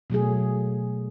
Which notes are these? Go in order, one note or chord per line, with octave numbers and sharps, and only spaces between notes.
B2 F#3 A3 G#4